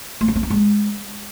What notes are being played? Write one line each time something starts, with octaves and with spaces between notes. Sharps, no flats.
A3
C#4
C4
D#4
G#3